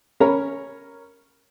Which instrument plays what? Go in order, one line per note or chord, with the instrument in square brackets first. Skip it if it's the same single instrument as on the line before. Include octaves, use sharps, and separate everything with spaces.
[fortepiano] C#4 A#4 C#5 A#5 B5